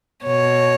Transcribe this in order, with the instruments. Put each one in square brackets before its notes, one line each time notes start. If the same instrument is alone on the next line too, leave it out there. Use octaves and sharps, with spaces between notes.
[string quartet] B2 C#5